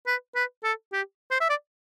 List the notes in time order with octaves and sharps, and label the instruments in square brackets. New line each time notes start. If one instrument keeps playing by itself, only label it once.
[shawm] B4
B4
A4
G4
C5
E5
D5